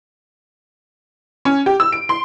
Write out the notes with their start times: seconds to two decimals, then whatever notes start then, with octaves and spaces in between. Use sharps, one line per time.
1.45 C#4
1.66 G4
1.80 E6
1.92 D7
2.09 C6